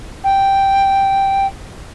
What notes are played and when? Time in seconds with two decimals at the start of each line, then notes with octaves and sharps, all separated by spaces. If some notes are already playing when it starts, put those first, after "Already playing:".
0.24 G5